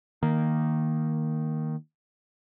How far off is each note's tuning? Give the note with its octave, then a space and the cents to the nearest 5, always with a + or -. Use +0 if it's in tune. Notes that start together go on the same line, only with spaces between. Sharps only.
D#3 +0 A#3 +0